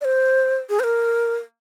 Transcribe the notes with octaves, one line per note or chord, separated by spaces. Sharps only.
D5
C5
G#4
C5
A#4